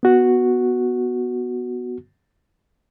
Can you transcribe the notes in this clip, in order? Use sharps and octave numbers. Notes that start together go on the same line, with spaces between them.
B3 F#4